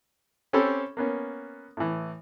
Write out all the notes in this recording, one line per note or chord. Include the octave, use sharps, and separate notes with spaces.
C4 C#4 G4 A4 B5
A#3 B3 C#4
A2 E3